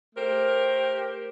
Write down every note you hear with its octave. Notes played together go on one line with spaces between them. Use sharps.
A3 G4 A#4 C5